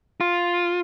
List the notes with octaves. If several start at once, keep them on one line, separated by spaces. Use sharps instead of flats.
F4